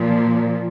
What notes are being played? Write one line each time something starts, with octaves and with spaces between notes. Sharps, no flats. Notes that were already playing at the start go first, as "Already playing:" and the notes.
Already playing: A#2 F3